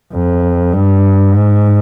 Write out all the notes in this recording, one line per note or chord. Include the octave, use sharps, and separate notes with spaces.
F2
G2
G#2